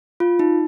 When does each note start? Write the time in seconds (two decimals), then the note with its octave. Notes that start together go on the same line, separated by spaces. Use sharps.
0.20 F4
0.39 D#4